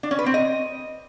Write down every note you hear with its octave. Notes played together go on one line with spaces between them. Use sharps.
D4
C#4
B4
C4
D#5